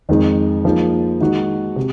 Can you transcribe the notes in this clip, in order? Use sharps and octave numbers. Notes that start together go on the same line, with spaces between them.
F2 D#3 G#3
F3 A#3 D#4 G#4
D#3 G#3 D#4 F#4
C3